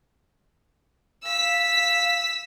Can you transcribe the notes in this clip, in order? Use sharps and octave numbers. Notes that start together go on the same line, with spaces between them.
F5 E6 B6